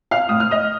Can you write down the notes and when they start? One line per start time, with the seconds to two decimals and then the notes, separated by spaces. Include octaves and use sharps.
0.11 F5 F6
0.29 A2 D#6
0.40 F6
0.51 D#5 D#6